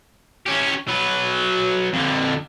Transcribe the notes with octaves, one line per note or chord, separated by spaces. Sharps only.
C#4 G4
F#3 B4
F2 D3